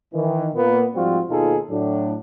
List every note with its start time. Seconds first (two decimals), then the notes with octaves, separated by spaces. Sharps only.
0.14 D#3 E3
0.54 A#2 A#3 B3
0.95 G#2 F3 G3 C4 F4 F#4
1.30 D#2 B2 D#4 F4 G#4 A4
1.70 A2 F#3 D4